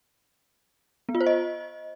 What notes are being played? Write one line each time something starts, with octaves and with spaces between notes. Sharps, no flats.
B3
F4
C5
D#5